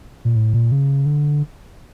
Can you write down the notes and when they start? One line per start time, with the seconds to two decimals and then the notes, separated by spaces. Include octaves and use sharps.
0.25 A#2
0.36 A2
0.54 A#2
0.72 C#3
1.06 D3